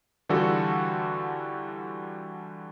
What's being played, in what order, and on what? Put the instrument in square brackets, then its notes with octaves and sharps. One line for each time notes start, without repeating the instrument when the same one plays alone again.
[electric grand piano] D3 E3 G3 F4 F#4 A4